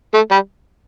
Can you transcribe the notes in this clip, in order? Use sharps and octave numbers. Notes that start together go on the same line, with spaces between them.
A3
G3